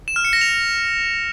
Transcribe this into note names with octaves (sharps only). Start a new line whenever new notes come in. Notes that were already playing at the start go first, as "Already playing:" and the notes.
E7
F6
C#7
A#6
F7